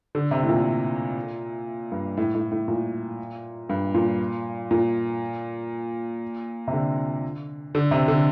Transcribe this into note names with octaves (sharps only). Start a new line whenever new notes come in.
D3
C3
A2
A#2
G2
A2
A2
A2
A#2
G2
A#2
A#2
C3
D3
D3
C3
D3